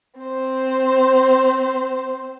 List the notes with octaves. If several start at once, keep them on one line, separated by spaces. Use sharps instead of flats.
C4 C5